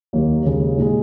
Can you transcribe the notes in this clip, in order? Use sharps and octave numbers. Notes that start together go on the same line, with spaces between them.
D#2 D#3 F#3 A#3
D#2 C#3 G#3
A#2 G#3